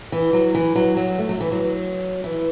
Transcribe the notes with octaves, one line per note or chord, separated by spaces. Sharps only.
E3
F#3
E3
F#3
F#3
A3
F#3
E3
F#3
E3